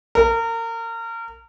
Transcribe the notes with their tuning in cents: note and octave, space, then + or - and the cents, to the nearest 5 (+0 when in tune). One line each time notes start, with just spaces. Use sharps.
A#4 -30